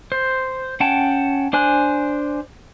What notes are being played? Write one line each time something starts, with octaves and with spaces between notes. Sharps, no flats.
C5
C#4 F#5 G5 A5
D4 C5 G#5 F#6